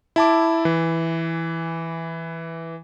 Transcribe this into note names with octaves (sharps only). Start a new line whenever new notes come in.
E4 A5 D6
E3